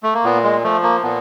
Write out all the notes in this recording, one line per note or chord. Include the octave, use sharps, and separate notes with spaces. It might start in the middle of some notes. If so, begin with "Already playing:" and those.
A3
A#3
A#2 B3
G#3
F3 A3
A#3
A#2 B3